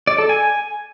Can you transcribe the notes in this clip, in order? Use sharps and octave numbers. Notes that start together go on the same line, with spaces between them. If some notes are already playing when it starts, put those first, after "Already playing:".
D5
A4
G#5